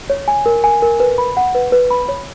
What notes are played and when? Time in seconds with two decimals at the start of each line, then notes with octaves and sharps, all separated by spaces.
0.10 C#5
0.28 G#5
0.46 A#4
0.64 G#5
0.82 A#4
1.00 B4
1.18 B5
1.37 F#5
1.55 B4
1.72 B4
1.90 B5
2.09 C#5